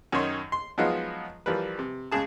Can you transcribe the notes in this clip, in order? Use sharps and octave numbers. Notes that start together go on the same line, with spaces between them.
F#2 D#3 D#4 C#5 C6
C6
F3 F#3 G#3 B3 D#4 F4
E3 F3 G3 A#4 B4
C3
C#2 C#3 G#4 A5